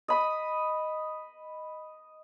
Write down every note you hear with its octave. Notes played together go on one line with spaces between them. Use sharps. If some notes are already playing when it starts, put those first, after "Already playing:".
D#5 B5 D#6